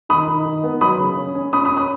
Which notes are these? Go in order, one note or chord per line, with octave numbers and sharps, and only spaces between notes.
D#3 B5 D#6
D#3
D#3
B3
F#3 B5 D#6
C#3
C#4
C#4
C#4 B5 D#6
B5 D#6
C#4
B5 D#6